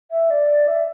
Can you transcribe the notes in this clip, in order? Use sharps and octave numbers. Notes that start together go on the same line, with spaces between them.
E5
D5
E5